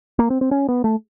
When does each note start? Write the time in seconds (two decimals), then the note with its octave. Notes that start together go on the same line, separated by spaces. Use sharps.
0.19 A#3
0.30 C4
0.41 C4
0.51 C#4
0.68 B3
0.84 A3